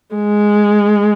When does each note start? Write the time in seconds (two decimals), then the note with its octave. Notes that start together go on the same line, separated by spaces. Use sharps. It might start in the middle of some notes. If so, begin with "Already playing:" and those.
0.15 G#3